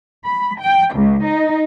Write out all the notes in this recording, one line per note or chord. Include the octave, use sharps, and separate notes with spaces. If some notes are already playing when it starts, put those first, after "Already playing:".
B5
G5
C#2
D#4